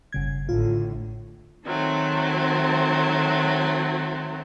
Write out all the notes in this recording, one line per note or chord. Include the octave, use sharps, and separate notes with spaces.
G1 C#3 G#6
A1 A2 D3 F4
D#3 F#3 A3 C4